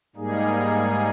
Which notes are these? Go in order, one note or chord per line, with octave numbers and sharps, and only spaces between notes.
G#2 G3 A#3 D#4 G#4